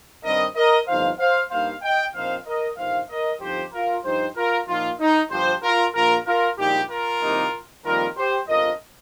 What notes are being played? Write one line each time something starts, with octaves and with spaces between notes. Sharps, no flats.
G2 D#3 G3 C4 A#4 D#5
A#4 D#5
G1 F2 F3 D#4 C5 F5
C5 F5
G2 G3 A#3 D#4 C5 F5
D#5 G5
A#1 A#2 F3 C4 D#4 C5 F5
A#4 D#5
G1 G2 D#3 C5 F5
A#4 D#5
G1 F2 F3 D#4 G4 C5
F4 A#4
G2 F3 D#4 G4 C5
F4 A#4
A#2 F3 A#3 D#4 F4
D#4
G1 G2 F3 G4 C5
F4 A#4
A#1 A#2 A#3 F4 A#4
F4 A#4
A#1 A#2 G3 D#4 G4
F4 A#4
C2 C3 D#3 A#3 D#4
F2 D#3 G3 A#3 F4 A#4
G4 C5
G1 F2 F3 A#4 D#5